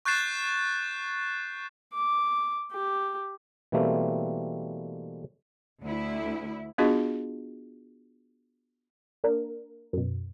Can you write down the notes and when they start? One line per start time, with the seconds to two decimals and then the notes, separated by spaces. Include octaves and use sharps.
0.05 C#6 F#6 G6 A6 C7 E7
1.94 D6
2.72 G4
3.72 B2 E3 G3 A3 A#3 C4
5.83 D2 E4
6.78 B3 D4 F4 F#4 G#4 D#5
9.24 A#3 D4 A#4
9.93 F#2 B2